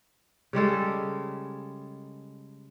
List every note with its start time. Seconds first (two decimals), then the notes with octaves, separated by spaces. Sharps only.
0.53 C#3 G3 G#3 A4